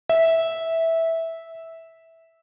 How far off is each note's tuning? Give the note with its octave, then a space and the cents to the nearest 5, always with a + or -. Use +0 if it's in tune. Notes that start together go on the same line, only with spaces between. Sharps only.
E5 -10